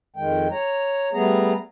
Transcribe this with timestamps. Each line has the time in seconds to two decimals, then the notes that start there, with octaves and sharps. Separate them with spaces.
0.16 F2 D#3 G#3 G5
0.51 C#5 A#5
1.13 G3 A3 B3 G#4 A#5